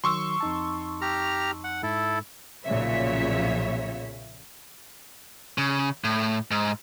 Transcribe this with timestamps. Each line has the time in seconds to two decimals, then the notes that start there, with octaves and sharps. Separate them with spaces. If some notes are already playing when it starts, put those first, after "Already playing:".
0.04 D#3 F#3 C6 C#6 E6
0.40 F2 D#4 A5
1.02 G4 A#5 F6
1.64 F#5
1.83 G#2 E4 A4
2.64 B1 A#2 C#3 F3 C#5 E5
5.58 C#3
6.04 A2
6.51 G#2